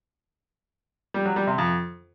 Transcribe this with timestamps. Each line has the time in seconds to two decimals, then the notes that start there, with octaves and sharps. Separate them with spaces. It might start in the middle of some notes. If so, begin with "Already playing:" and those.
1.14 G3
1.25 F#3
1.36 G3
1.47 C3
1.58 F2